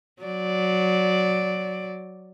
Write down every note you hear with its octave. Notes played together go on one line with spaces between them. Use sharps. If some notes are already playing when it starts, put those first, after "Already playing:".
F#3 D5